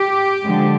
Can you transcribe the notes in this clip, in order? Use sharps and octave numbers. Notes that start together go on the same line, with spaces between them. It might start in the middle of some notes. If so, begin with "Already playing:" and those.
Already playing: G4
D3 F3 G#3